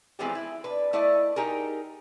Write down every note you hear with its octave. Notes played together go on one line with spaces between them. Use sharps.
E3 F3 G#3 B3 C4 G4
E4
D4 B4
A3 E4 D5 D#5
D#4 G4 G#4 A#4